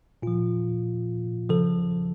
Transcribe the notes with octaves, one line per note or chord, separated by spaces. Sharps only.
A#2 F3 F4
C#3 F3 A4